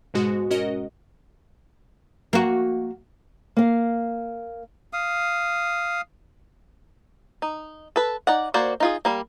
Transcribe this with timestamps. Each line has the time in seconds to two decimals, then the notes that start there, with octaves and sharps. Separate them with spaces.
0.14 G#2 B2 G#3 F#4
0.50 C#4 F#4 A#4 D#5
2.33 A#3 F#4
3.57 A#3 F5
4.93 F5 D#6
7.42 D#4
7.96 A4 B4
8.27 D#4 D5 F#5
8.54 A#3 F#4 C5 D5
8.80 D#4 F4 G#4
9.05 G3 A#3